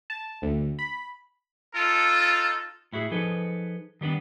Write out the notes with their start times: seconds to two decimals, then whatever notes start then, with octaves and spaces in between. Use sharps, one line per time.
0.10 A5
0.42 D2
0.79 B5
1.75 D#4 F4 A4
2.93 A2 E4 F#4 G#4
3.11 F3 D#4 G#4 A4 B4
4.01 D#3 G3 B3 D4